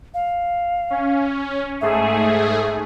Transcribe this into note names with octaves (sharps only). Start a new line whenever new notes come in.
F5
C#4
G#2 A3 G#4 E5